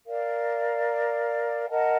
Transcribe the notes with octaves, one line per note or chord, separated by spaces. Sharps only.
A#4 D5 F5
A#4 D#5 F#5 A5